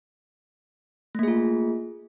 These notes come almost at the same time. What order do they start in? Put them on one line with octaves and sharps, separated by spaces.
A3 A#3 G#4 F4